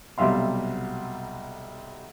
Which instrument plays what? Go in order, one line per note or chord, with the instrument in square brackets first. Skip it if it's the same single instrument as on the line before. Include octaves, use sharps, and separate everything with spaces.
[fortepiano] B1 C3 G3 E5 F5 C6